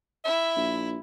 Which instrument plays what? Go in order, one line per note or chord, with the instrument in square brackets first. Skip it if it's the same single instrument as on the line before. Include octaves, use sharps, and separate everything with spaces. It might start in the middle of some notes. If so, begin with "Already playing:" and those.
[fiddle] E4 [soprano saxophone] E5
[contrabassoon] A#1